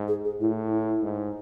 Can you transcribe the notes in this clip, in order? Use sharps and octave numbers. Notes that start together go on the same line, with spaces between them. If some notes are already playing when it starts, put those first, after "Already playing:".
Already playing: G#2
G#4
G#4
A2 E4
E4
G#2